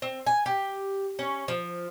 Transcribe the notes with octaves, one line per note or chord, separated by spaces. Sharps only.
C4
G#5
G4
C#4
F3